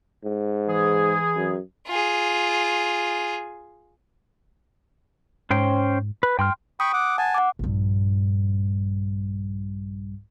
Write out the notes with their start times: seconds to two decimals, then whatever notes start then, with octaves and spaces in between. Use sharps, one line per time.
0.24 G#2
0.67 E3 G#4
1.35 F#2
1.87 F4 G#4
5.51 G#2 C#4 C5 G5
6.23 B4
6.39 G2 G5 C6 F6
6.80 G5 B5 C#6 D#6
6.93 F#5 D6
7.18 F#5 G#5 A5
7.34 F#5 D6
7.59 A#1 G2